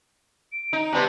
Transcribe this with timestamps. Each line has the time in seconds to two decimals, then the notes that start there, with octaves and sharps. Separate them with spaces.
0.52 D7
0.73 D#4
0.93 C3 G3 B3 A5